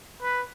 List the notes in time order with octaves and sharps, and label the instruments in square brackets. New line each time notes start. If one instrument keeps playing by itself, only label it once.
[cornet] B4